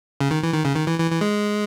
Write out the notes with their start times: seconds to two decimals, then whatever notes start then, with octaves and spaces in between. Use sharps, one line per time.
0.21 C#3
0.31 D#3
0.43 E3
0.54 D#3
0.65 C#3
0.76 D#3
0.87 E3
0.99 E3
1.11 E3
1.21 G#3